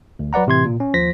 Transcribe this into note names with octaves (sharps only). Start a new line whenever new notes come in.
D2
F#3 B4 D5 F#5 A#5
A2 C3 E3 C6 G#6
A#2
C#4
D#2 F3 C5 A#6 B6